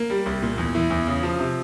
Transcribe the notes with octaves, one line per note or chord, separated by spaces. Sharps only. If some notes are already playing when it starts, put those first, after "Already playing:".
Already playing: A#3
G3
C2
A#2
E2
E3
E2
C#3
F3
C3